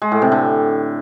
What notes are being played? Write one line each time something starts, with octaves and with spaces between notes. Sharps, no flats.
G#3
A2
C3
D3